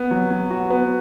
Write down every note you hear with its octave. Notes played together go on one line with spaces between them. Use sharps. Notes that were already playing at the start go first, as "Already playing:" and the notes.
Already playing: B3
F#3
F#3
F#4
B3